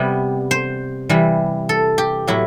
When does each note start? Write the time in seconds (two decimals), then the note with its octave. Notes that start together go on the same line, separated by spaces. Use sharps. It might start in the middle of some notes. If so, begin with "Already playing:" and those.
Already playing: C3 G3 B3
0.51 C5
1.09 C3 E3 G3
1.69 A4
1.98 G4
2.27 A2 F#3 B3 E4